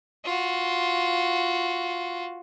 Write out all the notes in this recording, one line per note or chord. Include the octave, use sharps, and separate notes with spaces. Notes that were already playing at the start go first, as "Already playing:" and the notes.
F4 F#4